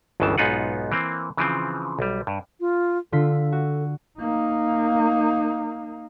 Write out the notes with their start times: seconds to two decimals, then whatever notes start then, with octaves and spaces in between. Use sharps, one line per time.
0.20 G1 C#2 G2 C#3 E3 A5
0.38 B1 G#2 B3 D#4 F4 F#5
0.92 E3 A#3 C4
1.37 C#3 E3 F3 C4
1.99 B1 G3
2.27 G2
2.60 F4
3.12 D3 F4 A4 B6
3.52 F#4
4.19 A#3 D#4